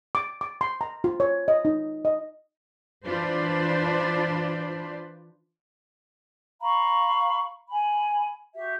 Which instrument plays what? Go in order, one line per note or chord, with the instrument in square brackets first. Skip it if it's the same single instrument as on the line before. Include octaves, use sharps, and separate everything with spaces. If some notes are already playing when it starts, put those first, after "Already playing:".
[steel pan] D6
D6
C6
A#5
F4
C#5
D#5
D#4
D#5
[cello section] E3 D4 F4 B4 C5 D5
[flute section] F5 A#5 B5 C#6
G#5 B5
F#4 G4 E5